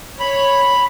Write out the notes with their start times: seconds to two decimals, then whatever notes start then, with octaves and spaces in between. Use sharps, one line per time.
0.20 C#5 B5